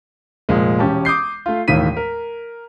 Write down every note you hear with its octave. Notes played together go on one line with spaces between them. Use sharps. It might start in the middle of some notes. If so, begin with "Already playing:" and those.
F1 A#2 G#3
E1 C#4 G4 A5
D6 D#6 G6 C7
A3 F4
E1 D#2 A2 D#3 B6 D#7
A#4